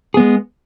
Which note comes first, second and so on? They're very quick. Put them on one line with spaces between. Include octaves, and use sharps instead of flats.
G#4 B3 G#3